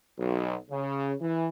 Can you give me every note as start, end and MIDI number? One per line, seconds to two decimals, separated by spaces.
0.18 0.57 35
0.70 1.13 49
1.20 1.48 52